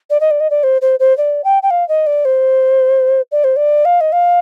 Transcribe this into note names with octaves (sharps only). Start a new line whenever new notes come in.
D5
D#5
D5
D#5
D5
C5
C5
C5
D5
G5
G5
F5
D#5
D5
C5
D5
C5
D5
F5
D#5
F5